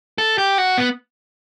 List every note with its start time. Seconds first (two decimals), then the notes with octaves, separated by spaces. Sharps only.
0.18 A4
0.38 G4
0.58 F#4
0.78 B3